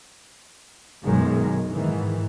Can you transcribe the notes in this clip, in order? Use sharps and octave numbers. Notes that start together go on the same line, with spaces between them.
B1 F#2 D#3 G#3
G#2 D#3 E3